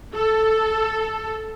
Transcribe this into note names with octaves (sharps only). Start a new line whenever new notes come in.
A4